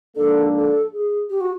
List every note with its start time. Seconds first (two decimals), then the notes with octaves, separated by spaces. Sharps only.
0.16 G#2 F3 A#3 D4 A4
0.55 A4
0.93 G#4
1.30 G4
1.41 F#4